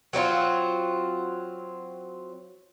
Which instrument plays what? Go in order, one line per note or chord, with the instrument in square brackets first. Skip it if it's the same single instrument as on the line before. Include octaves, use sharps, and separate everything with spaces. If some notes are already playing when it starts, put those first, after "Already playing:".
[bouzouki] F#3 C4 D#4 F4